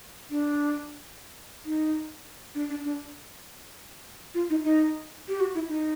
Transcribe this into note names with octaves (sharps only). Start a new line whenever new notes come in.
D4
D#4
D4
D4
D4
F4
D#4
D#4
G4
F#4
E4
D#4